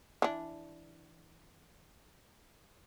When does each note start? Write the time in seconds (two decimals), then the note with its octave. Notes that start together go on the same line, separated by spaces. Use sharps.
0.22 E3 D4